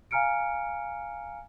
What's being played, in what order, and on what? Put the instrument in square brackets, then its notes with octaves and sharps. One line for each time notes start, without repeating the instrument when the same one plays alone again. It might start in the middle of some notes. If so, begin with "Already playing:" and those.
[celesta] F5 G#5 A#5 F6 C#7 D7